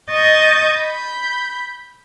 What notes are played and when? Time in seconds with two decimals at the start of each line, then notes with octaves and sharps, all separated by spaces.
0.10 D#5 C#6 G6 A6
0.80 B5 G6